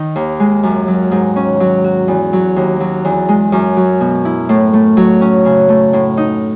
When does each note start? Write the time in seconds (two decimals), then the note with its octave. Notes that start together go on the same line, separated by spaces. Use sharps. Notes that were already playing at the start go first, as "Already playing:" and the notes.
Already playing: D#3 D#4
0.16 D#2
0.40 G#3
0.63 F#2
0.88 F#3
1.11 G#2
1.36 C#4
1.60 F#3
1.84 F#4
2.08 E2
2.33 F#3
2.56 D#2
2.80 F#3
3.05 E2
3.29 G#3
3.52 F#2
3.77 F#3
4.01 B2
4.25 E4
4.49 A2
4.73 A3
4.97 F#3
5.21 C#4
5.45 C#3
5.69 A3
5.93 A2
6.17 D#4